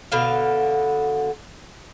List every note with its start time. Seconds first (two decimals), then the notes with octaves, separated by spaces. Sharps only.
0.12 B2 D3 F5